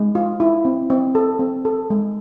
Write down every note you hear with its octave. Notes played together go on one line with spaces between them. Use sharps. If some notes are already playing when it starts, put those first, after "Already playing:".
Already playing: G#3
F4
E4
C4
C4
A4
C4
A4
G#3